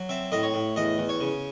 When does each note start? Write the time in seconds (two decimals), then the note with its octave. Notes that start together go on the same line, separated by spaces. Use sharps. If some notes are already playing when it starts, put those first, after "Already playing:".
Already playing: F#3
0.09 C4 E5
0.32 A2 D#5
0.43 C#5
0.54 A2
0.76 E2 D#5
0.98 E2
1.09 C#5
1.21 C#3